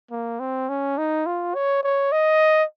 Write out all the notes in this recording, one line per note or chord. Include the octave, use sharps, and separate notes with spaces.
A#3
C4
C#4
D#4
F4
C#5
C#5
D#5